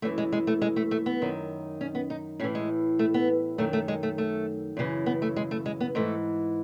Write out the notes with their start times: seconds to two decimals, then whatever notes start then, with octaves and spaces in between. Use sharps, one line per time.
0.02 F#2 E3 A3
0.18 G#3
0.32 G#3
0.47 A3
0.62 G#3
0.76 A3
0.91 A3
1.06 B3
1.22 F#2 D#3
1.81 C#4
1.95 B3
2.10 D#4
2.40 A2 C#4
2.44 E3
2.55 G#3
2.99 A3
3.14 B3
3.58 F#2 D#3 A3
3.73 A3
3.88 G#3
4.03 A3
4.18 A3
4.77 F#2 C#3 E3
5.06 B3
5.22 A3
5.36 G#3
5.51 A3
5.66 G#3
5.80 B3
5.95 G#2 E3 A3